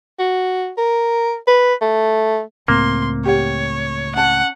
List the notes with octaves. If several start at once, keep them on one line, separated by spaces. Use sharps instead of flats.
F#4
A#4
B4
A3
C#2 A2 A#3 C4 C6
G4 C#5 F#5
C#4 F#5 A5